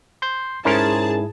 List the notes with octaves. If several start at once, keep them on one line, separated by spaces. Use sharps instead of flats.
C6 G6 C7
G#2 C#4 E4 G#4 A#4 C5 A5